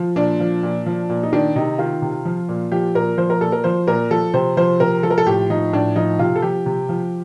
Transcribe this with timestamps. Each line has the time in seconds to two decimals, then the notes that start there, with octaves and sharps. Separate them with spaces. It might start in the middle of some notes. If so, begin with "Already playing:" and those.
Already playing: F3
0.16 A#2 D4
0.40 F3
0.63 A#2
0.86 F3
1.09 A#2
1.23 D#4
1.33 D#3 D4
1.56 C3 D#4
1.79 D#3 F4
2.02 C3
2.25 F3
2.49 A#2
2.72 F3 G4
2.95 A#2 A#4
3.18 F3 C5
3.30 A#4
3.41 A#2 A4
3.52 A#4
3.64 F3 C5
3.87 A#2 A#4
4.11 F3 A4
4.34 C3 C5
4.57 F3 C5
4.80 C3 A#4
5.03 F3 A4
5.10 A#4
5.18 A4
5.26 A2 G4
5.50 F3 D#4
5.73 A2 D4
5.96 F3 D#4
6.19 C3 F4
6.36 A4
6.42 F3 G4
6.66 C3
6.89 F3